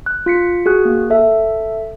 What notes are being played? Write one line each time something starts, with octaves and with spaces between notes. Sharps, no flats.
F#6
F4 B6 C#7
F#4 G#4 F#6
A#3
A4 E5